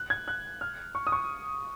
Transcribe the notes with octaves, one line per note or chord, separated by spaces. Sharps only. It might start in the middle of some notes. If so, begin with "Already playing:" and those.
Already playing: F#6
G#6
F#6
F6
C#6
D#6
C#6